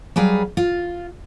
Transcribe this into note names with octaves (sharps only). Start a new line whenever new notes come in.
F#3 G3 G#4 B4 F5
F4